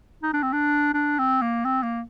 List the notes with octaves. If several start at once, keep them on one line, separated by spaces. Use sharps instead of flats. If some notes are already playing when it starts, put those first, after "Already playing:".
D#4
D4
C4
D4
D4
C4
A#3
C4
A#3